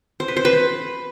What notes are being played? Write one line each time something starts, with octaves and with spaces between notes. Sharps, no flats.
C5
B4
C5
B4